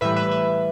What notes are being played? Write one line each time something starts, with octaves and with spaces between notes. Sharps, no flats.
A2 E3 G3 B4 E5
B4 E5
B4 E5